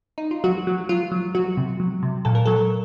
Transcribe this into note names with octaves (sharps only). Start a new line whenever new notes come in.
D#4
F4
F#3 F#4
F#3
F#3 F4
F#3
F#3 F#4
C3
F#3
C3
A#2 A4
A#4
F#3 A4